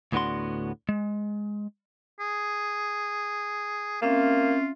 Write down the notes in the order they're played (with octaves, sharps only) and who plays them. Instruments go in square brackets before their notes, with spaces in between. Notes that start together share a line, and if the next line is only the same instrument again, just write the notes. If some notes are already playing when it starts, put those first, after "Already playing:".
[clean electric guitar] D2 A2 B3 D4 F#4 C6
G#3
[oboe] G#4
[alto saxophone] A#3 [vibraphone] C4 C#4 E5 [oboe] F4